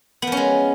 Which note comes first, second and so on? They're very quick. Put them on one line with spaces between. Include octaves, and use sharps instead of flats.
B3 F3 C#4 G#3